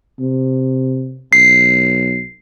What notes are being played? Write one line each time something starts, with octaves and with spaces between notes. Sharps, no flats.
C3
B1 C7